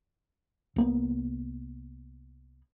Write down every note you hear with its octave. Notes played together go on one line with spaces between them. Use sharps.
C2 A#3 B3